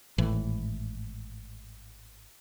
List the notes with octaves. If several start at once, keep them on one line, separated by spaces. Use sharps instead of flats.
G#1 A2 E3